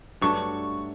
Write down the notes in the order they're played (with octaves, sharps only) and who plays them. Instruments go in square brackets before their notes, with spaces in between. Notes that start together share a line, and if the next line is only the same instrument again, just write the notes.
[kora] G2 F#3 A3 D4 [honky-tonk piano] C#6